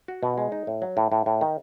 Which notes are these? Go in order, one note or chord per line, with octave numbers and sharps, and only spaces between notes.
F#4
B2
G#3
D#4
A2
F#3
A2
A2
A2
D#3